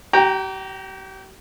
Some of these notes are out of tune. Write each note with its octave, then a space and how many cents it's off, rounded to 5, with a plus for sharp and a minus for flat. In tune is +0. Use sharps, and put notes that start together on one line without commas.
G4 -40 G5 +10 A#5 +0